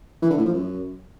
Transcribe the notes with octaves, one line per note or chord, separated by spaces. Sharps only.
E3
D3
A2
F3
F#2